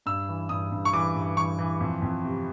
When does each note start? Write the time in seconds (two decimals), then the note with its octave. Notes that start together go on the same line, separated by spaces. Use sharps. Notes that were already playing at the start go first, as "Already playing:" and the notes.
0.06 G2 E6
0.28 E3
0.49 G2 D#6
0.72 G2
0.85 C#6
0.93 E3 D6
1.15 G2
1.37 E3 C#6
1.59 E3
1.81 F2
2.02 F2
2.24 C3